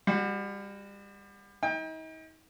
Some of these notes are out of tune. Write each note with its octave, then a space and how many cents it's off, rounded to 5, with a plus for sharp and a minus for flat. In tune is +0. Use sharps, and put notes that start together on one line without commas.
G3 +35 F#4 +0
D#4 +40 G5 +30